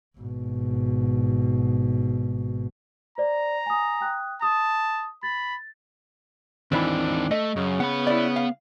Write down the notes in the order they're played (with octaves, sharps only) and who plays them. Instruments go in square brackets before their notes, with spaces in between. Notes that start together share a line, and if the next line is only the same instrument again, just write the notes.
[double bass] G#1 B2
[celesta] C5 D5 [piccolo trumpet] A#5
[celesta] G#5 D#6
G5 D#6 F#6
[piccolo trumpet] A5 [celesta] D#6
[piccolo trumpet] B5 [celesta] A6
[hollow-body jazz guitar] D#2 E3 B5 [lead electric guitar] D#3 C4 [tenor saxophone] D4
[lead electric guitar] A3 [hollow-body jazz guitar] D#5
[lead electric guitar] F#2 [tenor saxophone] C#3
[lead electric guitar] B3 B5 [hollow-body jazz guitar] F#5
[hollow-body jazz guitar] E4 D5
F5